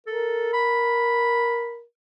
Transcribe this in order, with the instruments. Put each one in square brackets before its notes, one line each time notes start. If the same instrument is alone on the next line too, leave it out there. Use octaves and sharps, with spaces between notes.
[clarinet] A4 [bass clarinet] A#4
[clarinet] B5